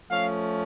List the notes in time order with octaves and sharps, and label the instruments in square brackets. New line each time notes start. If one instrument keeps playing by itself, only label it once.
[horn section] F3 A3 C#4 F5